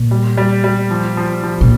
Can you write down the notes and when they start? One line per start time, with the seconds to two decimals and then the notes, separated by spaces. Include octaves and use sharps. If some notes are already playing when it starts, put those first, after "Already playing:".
Already playing: A#2
0.11 G3
0.37 G3
0.64 G3
0.91 F3
1.17 F3
1.43 F3
1.61 A#2